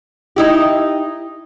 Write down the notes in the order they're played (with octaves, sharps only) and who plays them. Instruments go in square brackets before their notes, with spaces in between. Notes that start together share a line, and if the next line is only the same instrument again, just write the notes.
[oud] D#4 E4 G4